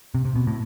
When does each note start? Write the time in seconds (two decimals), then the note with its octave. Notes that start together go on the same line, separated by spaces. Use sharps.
0.15 C3
0.25 C3
0.36 B2
0.47 A2